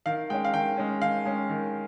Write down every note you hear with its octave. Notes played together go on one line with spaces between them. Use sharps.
D#3 F5
G#3 C#4 G5
F5
D#3 G5
G#3 C#4
D#3 F5
G#3 C#4
D#3